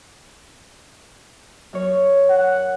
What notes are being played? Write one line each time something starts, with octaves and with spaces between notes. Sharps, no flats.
F#2 C#5
F#5